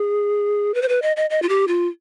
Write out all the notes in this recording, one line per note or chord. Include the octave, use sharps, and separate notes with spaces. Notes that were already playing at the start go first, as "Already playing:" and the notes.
Already playing: G#4
B4
C5
B4
D#5
D#5
D#5
F4
G4
F4